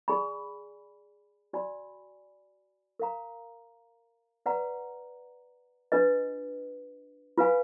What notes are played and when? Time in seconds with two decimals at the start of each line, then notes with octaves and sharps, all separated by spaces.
0.08 G#4 D5 G#5 B5
1.53 F#4 D5 G#5 B5
3.00 A#4 F5 A#5
4.46 B4 D5 F#5 A#5
5.92 D4 F4 B4 D#5
7.38 F4 B4 F5 G#5 B5